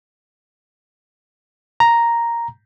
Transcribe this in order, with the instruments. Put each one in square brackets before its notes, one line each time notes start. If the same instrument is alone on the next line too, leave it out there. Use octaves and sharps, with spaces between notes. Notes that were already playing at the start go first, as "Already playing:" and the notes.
[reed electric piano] A#5